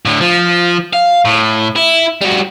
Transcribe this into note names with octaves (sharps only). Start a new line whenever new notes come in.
A2 D3
F3
F5
A2
E4
G3 F#4